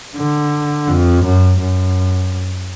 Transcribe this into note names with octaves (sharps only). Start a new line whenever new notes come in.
D3
F2
F#2
F#2